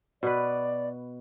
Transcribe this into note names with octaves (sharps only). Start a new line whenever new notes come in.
B2 B4 D5